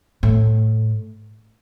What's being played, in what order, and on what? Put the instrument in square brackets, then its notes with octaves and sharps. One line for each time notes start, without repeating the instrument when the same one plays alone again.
[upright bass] A2